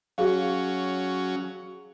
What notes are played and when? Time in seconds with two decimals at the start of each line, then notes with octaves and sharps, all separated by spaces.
0.18 F#3 C#4 F#4 G#4 F5